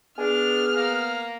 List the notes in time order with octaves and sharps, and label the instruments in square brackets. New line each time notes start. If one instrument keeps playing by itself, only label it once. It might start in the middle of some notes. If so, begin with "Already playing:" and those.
[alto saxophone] B3 [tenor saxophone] D4 [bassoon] G#4 [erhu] F6
[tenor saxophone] A#3